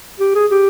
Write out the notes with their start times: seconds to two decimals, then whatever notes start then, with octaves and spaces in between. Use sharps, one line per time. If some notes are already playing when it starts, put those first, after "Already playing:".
0.20 G4
0.35 G#4
0.51 G4